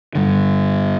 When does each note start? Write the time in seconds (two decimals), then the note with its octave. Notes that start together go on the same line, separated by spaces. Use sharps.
0.15 G2 D3